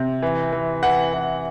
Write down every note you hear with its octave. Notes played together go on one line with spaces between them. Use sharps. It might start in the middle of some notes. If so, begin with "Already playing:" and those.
Already playing: C3
E3
E3
E3 F#5
E3